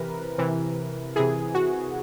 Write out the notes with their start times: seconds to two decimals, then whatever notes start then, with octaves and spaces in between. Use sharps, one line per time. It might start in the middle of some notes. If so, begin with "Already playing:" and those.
Already playing: C3 E3 A#4 B4
0.38 C3 E3
1.16 C3 E3 G#4
1.55 F#4